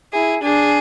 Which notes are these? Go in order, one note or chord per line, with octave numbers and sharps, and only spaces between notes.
E4 G#4
D4 G#4